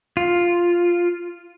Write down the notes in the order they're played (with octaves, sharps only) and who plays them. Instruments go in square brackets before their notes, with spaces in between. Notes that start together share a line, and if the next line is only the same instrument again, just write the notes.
[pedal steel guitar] F4